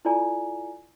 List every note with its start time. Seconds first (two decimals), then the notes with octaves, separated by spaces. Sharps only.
0.05 E4 F4 A4 D5 G#5 A#5